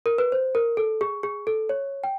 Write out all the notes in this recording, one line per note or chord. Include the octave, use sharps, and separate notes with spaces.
A#4
B4
C5
A#4
A4
G#4
G#4
A4
C#5
G5